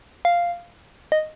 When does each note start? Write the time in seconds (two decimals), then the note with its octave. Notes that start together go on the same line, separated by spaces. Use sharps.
0.25 F5
1.12 D#5